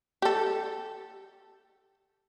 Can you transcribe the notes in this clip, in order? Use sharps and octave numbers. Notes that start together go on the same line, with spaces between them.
G4 A4